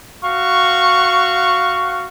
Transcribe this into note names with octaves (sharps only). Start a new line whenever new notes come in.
F#4 F5 C#6